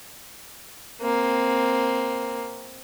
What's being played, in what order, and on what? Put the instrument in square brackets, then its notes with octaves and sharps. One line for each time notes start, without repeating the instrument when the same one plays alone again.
[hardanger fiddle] A#3 C4